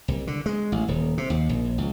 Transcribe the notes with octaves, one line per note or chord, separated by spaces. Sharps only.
C2
D3
G#3
A1
D#1
C3
D#2
A#1
C#2